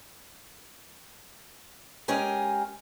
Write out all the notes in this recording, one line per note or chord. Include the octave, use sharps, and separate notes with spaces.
G#3 C#4 G4 A#4 G#5